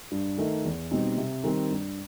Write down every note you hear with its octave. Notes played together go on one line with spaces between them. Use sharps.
G2
D#3 A3 D#4
E2
B2 G3 C4 D#4
C3
D#3 G3 C4
G2